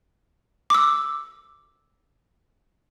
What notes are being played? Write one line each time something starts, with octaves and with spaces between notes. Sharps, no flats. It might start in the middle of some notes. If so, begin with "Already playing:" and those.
D6 E6